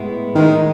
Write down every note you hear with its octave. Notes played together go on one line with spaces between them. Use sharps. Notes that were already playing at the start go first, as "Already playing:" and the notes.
Already playing: A2 G#3 B3 E4
A2 D#3 G#3 D#4